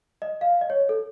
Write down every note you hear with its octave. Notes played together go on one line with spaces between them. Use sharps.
D#5
F5
D#5
C#5
A4